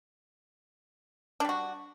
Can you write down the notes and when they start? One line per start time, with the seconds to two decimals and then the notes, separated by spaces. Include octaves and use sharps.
1.40 D4
1.45 G3
1.49 F#4